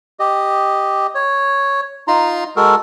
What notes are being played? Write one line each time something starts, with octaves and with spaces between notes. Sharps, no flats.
G4 D#5
C#5
D#4 F4 A#5 C6
G#3 F#4 A4 A#4